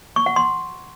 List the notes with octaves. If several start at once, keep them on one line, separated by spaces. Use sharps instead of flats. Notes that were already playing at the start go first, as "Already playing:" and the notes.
C#6
F#5
C6